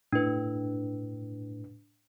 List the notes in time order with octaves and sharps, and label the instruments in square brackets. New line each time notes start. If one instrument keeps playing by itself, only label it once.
[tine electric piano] A2 [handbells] D4 B4